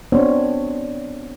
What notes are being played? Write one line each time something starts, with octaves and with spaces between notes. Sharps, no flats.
B3 C4 D4 F#4 C5 C#5